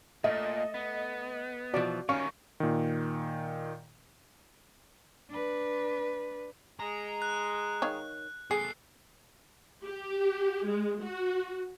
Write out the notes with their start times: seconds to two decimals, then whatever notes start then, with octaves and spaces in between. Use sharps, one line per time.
0.24 A#2 A3 D#5 F5
0.74 B3
1.74 B2 E3 F3 F#4 D5 D6
2.09 D#3 G3 C#4 F5 C#6
2.60 A#2 D#3
5.30 D4 B4
6.80 G#3 A#5
7.22 F#6
7.82 D#3 C#5 F5
8.51 B3 G#4 A4 C7
9.83 G4
10.67 G#3
11.02 F#4